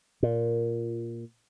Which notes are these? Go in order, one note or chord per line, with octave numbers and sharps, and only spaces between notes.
A#2